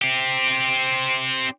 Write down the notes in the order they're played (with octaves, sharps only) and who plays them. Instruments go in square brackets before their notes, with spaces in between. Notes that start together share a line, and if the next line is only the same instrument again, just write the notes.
[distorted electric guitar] C4 G4